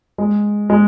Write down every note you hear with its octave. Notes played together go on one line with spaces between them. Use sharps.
G#3
G#3